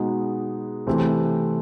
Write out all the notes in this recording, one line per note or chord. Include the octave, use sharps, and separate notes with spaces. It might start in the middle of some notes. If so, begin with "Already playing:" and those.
Already playing: B2 G#3 B3 D#4 F#4
C3 E3 A3 C4